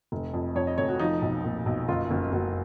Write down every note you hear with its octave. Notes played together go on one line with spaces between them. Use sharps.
F1
F2
F2 C#5
D#5
F1 C#5
F#4
F3 D#4
B1
A#2
B1
F#1 F4
F#1
F#1 F#4